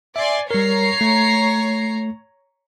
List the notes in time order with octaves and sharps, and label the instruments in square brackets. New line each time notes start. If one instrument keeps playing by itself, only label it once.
[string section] D5 G#5 C6 [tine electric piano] E5
[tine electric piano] G3 A#4 [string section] C#5 A#5 C7
[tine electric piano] A3